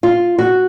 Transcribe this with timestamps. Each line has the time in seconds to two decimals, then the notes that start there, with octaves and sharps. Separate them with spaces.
0.03 F4
0.38 F#4